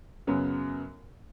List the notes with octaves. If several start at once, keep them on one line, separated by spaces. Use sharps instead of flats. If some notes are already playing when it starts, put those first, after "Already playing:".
F#2 C#3 F#3 B3